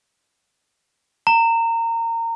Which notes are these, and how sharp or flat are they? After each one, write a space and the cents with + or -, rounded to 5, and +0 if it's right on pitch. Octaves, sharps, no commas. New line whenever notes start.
A#5 -25